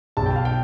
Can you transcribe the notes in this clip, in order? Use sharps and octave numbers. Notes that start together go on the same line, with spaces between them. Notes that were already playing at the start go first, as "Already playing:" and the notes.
B1 A5
G5
F5
G5